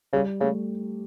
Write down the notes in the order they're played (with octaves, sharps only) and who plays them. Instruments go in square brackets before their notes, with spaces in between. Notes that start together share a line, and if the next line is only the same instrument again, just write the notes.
[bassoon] C#3 [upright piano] G3
[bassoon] C#3 [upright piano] A3